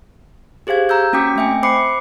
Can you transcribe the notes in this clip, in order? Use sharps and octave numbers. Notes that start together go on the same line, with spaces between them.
G4 G#4 C5 F5 G#6
A#5 E6 G6
A#3 C#4 F#4 G5 D6 B6
A3 C4 E5 G5 G#5
C5 B5 D6 C7 C#7